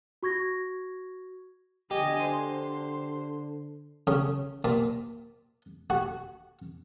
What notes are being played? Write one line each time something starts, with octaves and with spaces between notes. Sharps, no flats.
F#4 C#6 G#6 A#6
D3 G4 D#5 G#5
C5
C#3
A#2
F#4